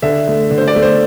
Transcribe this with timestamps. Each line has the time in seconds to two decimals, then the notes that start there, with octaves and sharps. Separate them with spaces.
0.02 D3 E5
0.28 A3
0.51 D3
0.58 C5
0.68 D5
0.76 A3
0.83 C5